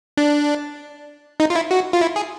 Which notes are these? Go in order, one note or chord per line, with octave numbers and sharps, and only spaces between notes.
D4
D#4
F4
E4
F#4
F4
E4
G#4